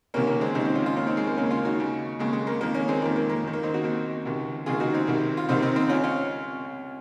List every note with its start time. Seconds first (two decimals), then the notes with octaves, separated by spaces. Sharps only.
0.14 C#2 C3 D#3 A#3 C#4
0.27 A#3
0.41 G#3 C4
0.55 C#2 C3 D#3 C4 D#4
0.65 C4 D#4
0.75 C#4 F4
0.86 C#4 F4
0.96 D#2 C#3 C#4 F4
1.07 C4 D#4
1.17 G#3
1.27 A#3
1.37 D#2 C#3 A#3 C#4
1.51 C#4 F4
1.65 D#4 F#4
1.79 D#2 C#3
2.19 D#2 C#3 G#3
2.33 G#3
2.47 A#3
2.61 F2 D#3 A#3
2.74 A#3 C#4
2.88 G#3 C4
3.02 F2 D#3 A#3
3.16 A#3
3.30 A#3
3.43 D#2 D#3
3.53 A#3
3.63 C4 D#4
3.74 D#4 F#4
3.84 D#2 D#3
4.25 C#2 C3 D#3
4.66 C#2 C3 D#3 F4 G#4
4.80 D#4 F#4
4.94 C4 D#4
5.07 C2 C3 D#3
5.37 F4
5.49 C2 C3 D#3 C4 D#4
5.62 C4 D#4
5.76 C4 D#4
5.89 C#2 C#3 C#4 F4
6.03 C#4 F4